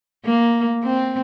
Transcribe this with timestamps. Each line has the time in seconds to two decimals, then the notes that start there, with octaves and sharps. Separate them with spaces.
0.25 A#3
0.84 C4